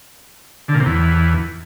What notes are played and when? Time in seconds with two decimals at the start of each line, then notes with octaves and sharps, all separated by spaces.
0.68 D3
0.74 A#2
0.80 C3
0.86 E2